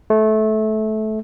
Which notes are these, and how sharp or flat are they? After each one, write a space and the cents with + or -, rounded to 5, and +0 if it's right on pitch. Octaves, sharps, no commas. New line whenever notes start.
A3 -20